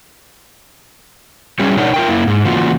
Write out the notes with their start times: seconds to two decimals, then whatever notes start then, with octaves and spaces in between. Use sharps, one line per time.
1.59 F#3 G3 C#4 G#4
1.77 B2 D4 D#4 A#4 C#5 F#5
1.94 F4 A#4 G5
2.08 F#2 A#3 E4
2.27 G#2
2.45 C#3 E3 A#3 F4 F#4